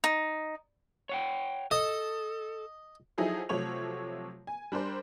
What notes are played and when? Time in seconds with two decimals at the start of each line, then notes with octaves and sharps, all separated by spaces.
0.04 D#4
1.09 C#5 F#5 G5
1.71 A4 D#5
3.18 F3 F#3 D#4 E4 G#4 A4
3.49 C3 F3 F#3 A3 C#5 F7
4.47 G#5
4.72 G3 D4 A#4 C5